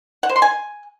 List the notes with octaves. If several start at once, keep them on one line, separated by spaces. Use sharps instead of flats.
F#5
C5
C6
G#5